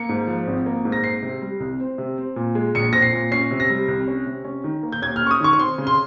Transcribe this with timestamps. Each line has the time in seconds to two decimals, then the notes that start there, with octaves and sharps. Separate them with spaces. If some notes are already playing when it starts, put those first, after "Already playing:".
Already playing: A#3 C#7
0.09 G#2
0.27 F3
0.47 G#1
0.66 A#3
0.85 G#2
0.92 A#6
1.04 C4 C7
1.23 C3
1.42 G3
1.60 C2
1.80 C4
1.98 C3
2.18 C4
2.36 A#2
2.55 G#3
2.75 A#1 C#7
2.93 C4 A#6
3.02 C7
3.13 A#2
3.32 C#4 C7
3.51 C3
3.60 A#6
3.70 G3
3.88 C2
4.07 C#4
4.26 C3
4.45 C#4
4.64 D#3
4.83 A#3
4.92 G6
5.02 D#2 G#6
5.16 F6
5.21 C#4
5.27 C#6
5.31 D#6
5.41 D#3 C#6
5.53 C#6
5.59 C4 C6
5.78 C#3
5.87 C6